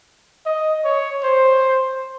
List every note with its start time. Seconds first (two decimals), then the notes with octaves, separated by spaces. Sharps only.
0.46 D#5
0.85 C#5
1.24 C5